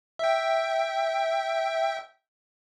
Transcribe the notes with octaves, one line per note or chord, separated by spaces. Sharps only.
E5 G5